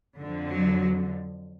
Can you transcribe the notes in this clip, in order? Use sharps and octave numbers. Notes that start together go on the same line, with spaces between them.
F2 D3
F#3